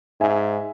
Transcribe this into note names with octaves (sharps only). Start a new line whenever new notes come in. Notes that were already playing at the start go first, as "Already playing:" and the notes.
G#2 E5 G#5